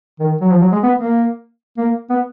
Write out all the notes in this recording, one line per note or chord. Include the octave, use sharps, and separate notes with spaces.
D#3
F#3
F3
F#3
G#3
B3
A#3
A#3
B3